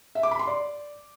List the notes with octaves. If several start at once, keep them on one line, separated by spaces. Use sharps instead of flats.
E5
D6
B5
C6
D5